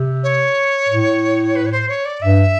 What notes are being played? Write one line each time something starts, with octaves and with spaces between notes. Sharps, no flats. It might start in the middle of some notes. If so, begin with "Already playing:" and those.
Already playing: C3
C#5
A2
B4
C#5
C5
C#5
D5
G2 E5